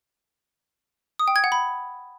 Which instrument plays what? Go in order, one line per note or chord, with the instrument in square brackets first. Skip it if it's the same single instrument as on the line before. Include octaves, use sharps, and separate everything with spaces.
[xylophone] D#6
G5
G#6
F#5
B5